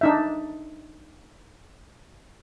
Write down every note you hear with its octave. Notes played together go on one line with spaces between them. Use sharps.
D4 D#4 E5